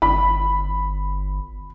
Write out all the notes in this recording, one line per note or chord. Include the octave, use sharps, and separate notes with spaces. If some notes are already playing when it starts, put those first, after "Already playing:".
G1 B5